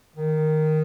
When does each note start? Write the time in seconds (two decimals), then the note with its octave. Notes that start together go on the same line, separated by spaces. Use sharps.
0.16 D#3